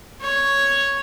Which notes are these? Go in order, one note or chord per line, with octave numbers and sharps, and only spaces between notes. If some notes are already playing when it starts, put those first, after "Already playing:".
C#5